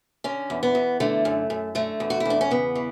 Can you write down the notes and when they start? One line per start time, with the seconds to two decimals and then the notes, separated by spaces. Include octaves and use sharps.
0.24 D3 C#4
0.50 E2
0.63 B3
0.75 E2
1.00 D3 A3
1.25 F#2
1.50 F#2
1.75 D3 A3
2.00 E2
2.10 F#4
2.20 E4
2.25 E2 D4
2.41 C#4
2.51 C#3 B3
2.75 E3